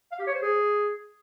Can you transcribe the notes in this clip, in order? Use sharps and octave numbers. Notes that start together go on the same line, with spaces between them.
F5
G4
C#5
C5
G#4